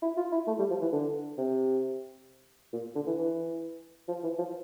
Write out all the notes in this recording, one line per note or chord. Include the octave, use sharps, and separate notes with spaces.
E4
F4
E4
A3
G3
F3
E3
D3
C3
A#2
D3
E3
E3
F3
E3
F3